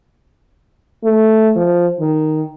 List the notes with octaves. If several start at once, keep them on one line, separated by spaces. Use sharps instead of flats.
A3
F3
D#3